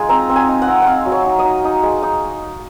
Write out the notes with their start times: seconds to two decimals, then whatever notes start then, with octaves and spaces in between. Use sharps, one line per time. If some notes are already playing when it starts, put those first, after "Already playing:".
Already playing: G#3 D#4 F4 G#5
0.09 C4 A#5
0.29 C4
0.36 G#5
0.49 D#4
0.62 F#5
0.68 C4
0.82 C4 F5 F#5
1.06 F#3
1.12 C#5
1.26 D#4
1.39 D#5
1.44 D#4
1.64 D#4
1.83 G#3
2.03 D#4